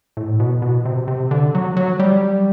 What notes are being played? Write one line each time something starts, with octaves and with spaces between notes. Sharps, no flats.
A2
B2
B2
C3
C3
D3
F#3
F#3
G3